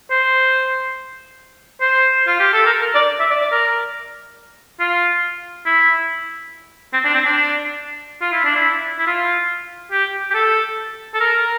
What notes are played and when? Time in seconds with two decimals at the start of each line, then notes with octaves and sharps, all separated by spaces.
0.11 C5
1.81 C5
2.27 F4
2.40 G4
2.53 A4
2.66 A#4
2.81 A#4
2.95 D5
3.20 E5
3.31 D5
3.41 D5
3.52 A#4
4.80 F4
5.66 E4
6.93 C4
7.05 D4
7.15 C4
7.26 D4
8.21 F4
8.32 E4
8.45 D4
8.56 E4
8.99 E4
9.07 F4
9.92 G4
10.31 G4
10.34 A4
11.14 A4
11.21 A#4